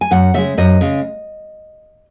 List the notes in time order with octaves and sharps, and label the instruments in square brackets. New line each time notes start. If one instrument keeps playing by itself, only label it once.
[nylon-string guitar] G#5
F#2 F#5
C#3 G#3 E5
F#2 D#5
C#3 G#3